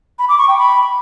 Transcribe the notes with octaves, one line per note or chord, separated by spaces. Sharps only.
B5
D6
C#6
G5
B5